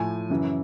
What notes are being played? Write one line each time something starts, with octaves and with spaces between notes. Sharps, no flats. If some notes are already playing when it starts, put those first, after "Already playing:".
Already playing: A2 F3 G#5
F#2 C#3 E3